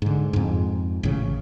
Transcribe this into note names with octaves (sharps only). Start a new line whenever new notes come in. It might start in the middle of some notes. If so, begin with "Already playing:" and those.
G#2 D3
F2 G#2
A1 C#3